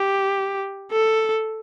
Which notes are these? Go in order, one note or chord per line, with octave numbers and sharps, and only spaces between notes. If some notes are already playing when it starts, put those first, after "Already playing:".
Already playing: G4
A4